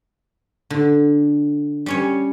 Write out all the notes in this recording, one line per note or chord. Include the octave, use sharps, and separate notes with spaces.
D3
G3 C#4 C#5